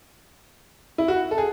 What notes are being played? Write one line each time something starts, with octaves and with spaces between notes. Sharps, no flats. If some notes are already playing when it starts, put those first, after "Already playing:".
E4
F#4
A4
G#4